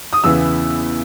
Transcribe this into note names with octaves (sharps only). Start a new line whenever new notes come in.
D#6
E2 C#3 E3 B3 E6